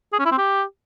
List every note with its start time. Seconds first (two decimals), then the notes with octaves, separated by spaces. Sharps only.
0.13 G#4
0.19 C#4
0.25 E4
0.32 C4
0.38 G4